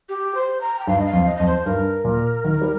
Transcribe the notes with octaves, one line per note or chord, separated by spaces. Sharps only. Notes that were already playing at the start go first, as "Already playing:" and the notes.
G4
C5
A#5
G5
G2 F5
D#5
F5
F2
D#5
F2 D#5
C5
G2 A#4
A#2
D#3
G3